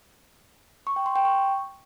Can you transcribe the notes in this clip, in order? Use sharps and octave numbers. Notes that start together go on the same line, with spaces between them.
C#6
G5
C6
G5
C#6